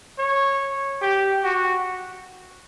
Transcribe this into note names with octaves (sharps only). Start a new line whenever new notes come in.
C#5
G4
F#4